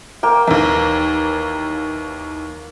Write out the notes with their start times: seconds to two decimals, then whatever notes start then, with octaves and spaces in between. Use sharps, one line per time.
0.23 A#3 G5
0.47 D#2 E3 A#5